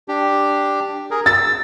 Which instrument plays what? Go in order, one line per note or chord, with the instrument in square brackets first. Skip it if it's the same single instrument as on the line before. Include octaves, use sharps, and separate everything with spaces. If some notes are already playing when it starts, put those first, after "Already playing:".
[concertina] D4 G4
G#4 A#4
[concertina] E6 [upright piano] A6